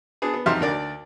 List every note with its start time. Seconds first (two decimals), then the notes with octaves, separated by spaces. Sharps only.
0.22 B3 D4 G#4
0.34 B3
0.46 F2 D#4 G4 E5 C6 F6
0.60 D2 D3 A#4 D5 D6